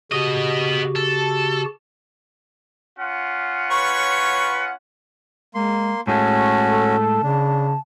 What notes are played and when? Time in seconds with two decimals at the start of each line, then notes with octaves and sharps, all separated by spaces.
0.12 C#3 B3 F#4 G4 D#5
0.96 A4
2.98 C#4 F4 F#5
3.71 B4 C#5 C#6
5.54 G#3 A#3 C6
6.07 A2 G#3 A3 C#4 F#4 A5
6.68 A4
7.23 C#3 D4